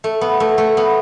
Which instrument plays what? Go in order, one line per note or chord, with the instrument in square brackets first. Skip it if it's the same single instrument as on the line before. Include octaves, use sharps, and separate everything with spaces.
[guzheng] A3
B3
A3
A3
B3